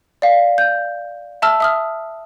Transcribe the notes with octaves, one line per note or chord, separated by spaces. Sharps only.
D5 F5
G6
E5 A5 E6 F6
E5 D#6 F6